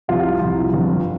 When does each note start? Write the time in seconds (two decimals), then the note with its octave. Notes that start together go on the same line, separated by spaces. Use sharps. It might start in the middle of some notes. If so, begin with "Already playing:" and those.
0.08 C2 C3 F3 F4 F5
0.41 C2 C3 F3
0.73 G1 F2 F3